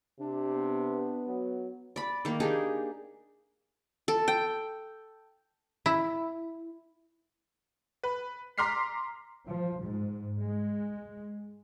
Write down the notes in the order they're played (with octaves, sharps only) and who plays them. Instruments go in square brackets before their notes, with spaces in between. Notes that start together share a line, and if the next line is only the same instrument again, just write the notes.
[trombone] C3 [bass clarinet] D4
[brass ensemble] B3
[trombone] F#3
[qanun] D5 B5
D#3 A#3
D4 D#4 G4 G#4
A4
G5
[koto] E4
[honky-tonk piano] B4
A#5 C6 D6 F6 B6 C7
[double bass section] F3
G#2
G#3